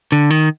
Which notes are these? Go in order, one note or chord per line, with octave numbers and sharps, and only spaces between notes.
D3
D#3